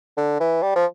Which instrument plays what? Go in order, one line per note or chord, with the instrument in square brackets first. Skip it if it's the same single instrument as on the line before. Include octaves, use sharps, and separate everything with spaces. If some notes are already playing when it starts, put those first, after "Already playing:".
[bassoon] D3
E3
G3
F3